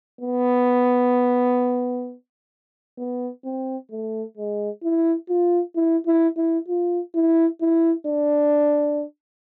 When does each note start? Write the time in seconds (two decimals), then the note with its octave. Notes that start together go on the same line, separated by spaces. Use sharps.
0.21 B3
2.99 B3
3.45 C4
3.91 A3
4.37 G#3
4.83 E4
5.29 F4
5.76 E4
6.06 E4
6.37 E4
6.68 F4
7.14 E4
7.61 E4
8.07 D4